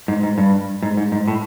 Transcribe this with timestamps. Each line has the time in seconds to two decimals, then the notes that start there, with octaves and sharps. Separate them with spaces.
0.08 G#2
0.23 G#2
0.38 G2
0.83 G#2
0.97 G#2
1.12 G#2
1.28 A2